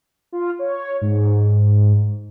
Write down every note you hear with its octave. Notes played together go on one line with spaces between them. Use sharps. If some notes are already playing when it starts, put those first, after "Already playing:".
F4
C#5
G#2